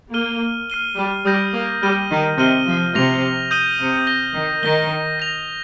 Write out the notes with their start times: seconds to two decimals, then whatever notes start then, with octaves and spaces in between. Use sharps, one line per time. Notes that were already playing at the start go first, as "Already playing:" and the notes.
0.13 A#3 F6 D#7 G7
0.70 F6 C7 D#7 G7
0.98 G3
1.26 G3 D#6 G6 A#6 D#7
1.54 A#3
1.82 G3 F6 D#7 G7
2.10 D#3
2.38 C3 F6 D#7 G7
2.67 F3
2.94 C3 A#6 F7
3.51 D#6 G6 D#7 G7
3.80 C3
4.07 A#6 G7
4.35 D#3
4.63 D#3 A#6 G7
5.20 A#6 F7